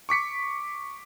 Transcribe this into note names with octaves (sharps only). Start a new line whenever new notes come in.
C#6 D6 B6 C#7